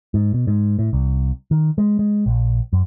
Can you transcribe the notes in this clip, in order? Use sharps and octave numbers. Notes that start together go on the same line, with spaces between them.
G#2
B2
G#2
A2
C2
D#3
G#3
G#3
A#1
F#2